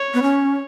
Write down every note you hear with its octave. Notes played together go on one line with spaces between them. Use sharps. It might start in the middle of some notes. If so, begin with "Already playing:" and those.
Already playing: C#5
B3
C#4